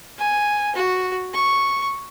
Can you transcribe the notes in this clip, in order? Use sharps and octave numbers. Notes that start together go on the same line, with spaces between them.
G#5
F#4
C#6